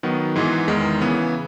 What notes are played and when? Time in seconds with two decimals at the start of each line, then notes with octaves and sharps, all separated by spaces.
0.03 D#3 F#3 B3
0.36 G#2 E3 G#3 B3
0.68 E2 D#3 G#3
1.01 C#3 E3 B3